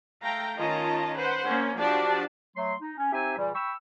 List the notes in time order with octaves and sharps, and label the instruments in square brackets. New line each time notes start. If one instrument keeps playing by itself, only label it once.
[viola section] A3 F5 G5 A#5
D#3 C#4 F4 D#5 A5 A#5
B4 C5 F#5
A#3 C4 C#4
F3 D4 F#4 G4 D5 A5
[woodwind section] F#3 A3 C6
D#4
C#4
C4 D#4 G4 C5 E5 G#5
A#2 C#3 E3 G3
G5 B5 C#6 E6